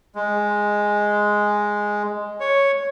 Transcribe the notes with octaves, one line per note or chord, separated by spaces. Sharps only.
G#3
C#5